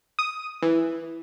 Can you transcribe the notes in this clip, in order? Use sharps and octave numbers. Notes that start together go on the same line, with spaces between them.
D#6
E3